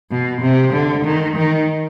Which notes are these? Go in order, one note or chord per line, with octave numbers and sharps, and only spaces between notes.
B2
C3
D3
D#3
D#3